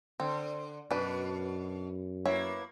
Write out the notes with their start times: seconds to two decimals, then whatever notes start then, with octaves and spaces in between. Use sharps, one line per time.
0.20 D3 C4
0.91 F#2 B2 D4 B4
2.25 A#3 B3 E4 C#5 E5